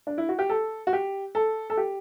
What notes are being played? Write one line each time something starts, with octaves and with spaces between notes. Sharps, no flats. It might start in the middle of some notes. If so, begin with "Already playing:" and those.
D4
E4
F#4
G4
A4
F#4
G4
A4
A4
G4